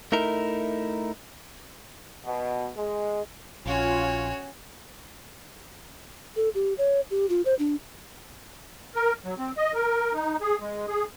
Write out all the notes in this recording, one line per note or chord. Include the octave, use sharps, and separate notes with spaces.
A3 D#4 E4 A#4
B2
G#3
A#1 C#4 F4 F#4 C#5 G#5
A4
G4
C#5
G4
F4
C5
D4
A#4
F#3
C4
D#5
A#4
D#4
G#4
G#3
G#4